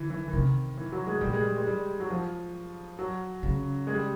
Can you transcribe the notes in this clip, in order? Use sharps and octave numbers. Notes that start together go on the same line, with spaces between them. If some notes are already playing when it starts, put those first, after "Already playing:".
Already playing: D3 E3
E3
E3
C3 D#3
E3
F#3
G#3
A#2 G3
G#3
G3
G#3
G3
F#3
F3
F#3
C#3
G#3
G3